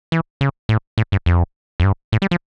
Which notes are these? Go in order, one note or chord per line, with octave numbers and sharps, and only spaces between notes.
E3
C#3
A2
A2
G2
F2
F2
G2
A2
G3
F3